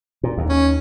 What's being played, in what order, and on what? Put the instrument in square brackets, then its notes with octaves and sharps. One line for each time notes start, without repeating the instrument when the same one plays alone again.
[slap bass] A#2
D#2
[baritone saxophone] C#4